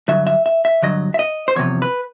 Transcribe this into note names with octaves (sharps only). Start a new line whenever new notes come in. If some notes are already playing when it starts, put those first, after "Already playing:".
G2 D3 F#3 E5
E5
E5
E5
G2 D3 F#3 D#5
E5
D#5
C5
E2 C3 F3 C#5
B4